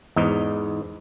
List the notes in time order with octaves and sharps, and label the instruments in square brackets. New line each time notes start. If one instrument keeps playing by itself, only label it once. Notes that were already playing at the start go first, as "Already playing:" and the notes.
[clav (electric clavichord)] E2 G#2 D#4